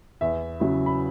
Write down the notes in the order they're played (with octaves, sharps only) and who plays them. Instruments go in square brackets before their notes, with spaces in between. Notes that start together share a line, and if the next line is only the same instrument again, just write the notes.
[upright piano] E2 E5
C#3 F#3 E4
B5